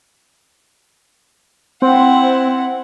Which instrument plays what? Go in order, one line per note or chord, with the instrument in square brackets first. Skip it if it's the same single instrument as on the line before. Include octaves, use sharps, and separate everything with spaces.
[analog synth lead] C4 [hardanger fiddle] E4 F#5